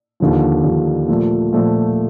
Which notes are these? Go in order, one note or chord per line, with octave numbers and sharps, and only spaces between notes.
D#2 D3 F3
D#2 D3 F3
A#2 F3 A3
A#2 F3 A3